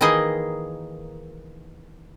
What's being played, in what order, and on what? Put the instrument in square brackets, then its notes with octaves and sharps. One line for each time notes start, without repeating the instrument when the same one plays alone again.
[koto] D#3 E3 A#3 D#4 G#4 D#5